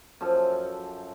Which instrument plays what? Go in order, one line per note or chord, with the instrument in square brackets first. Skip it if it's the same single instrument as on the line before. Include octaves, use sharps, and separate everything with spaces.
[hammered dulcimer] F#2 F3 A4 C6